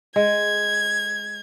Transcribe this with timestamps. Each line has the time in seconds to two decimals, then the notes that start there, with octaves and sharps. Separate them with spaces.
0.16 G#3 G#6